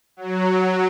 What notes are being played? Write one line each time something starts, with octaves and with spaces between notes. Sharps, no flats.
F#3